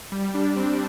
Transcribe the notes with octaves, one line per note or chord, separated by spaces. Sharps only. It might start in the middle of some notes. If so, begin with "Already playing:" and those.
G3
D4
C4